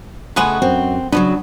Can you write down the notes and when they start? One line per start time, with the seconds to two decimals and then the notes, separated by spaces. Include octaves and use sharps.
0.36 C#3 G#3 A3 B3 F#4 G#4
0.62 F#2 C4
1.12 C#3 E3 F#3 B3 D4